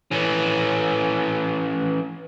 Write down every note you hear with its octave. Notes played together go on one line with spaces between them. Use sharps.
E3 C#4